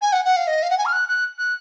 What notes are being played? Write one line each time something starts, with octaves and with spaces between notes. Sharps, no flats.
G#5
F#5
F#5
F5
D#5
F5
F#5
G#5
F6
F#6
F#6
F#6